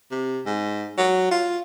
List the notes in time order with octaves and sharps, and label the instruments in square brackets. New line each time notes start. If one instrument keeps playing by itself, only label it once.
[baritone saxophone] C3
G#2
F#3
F4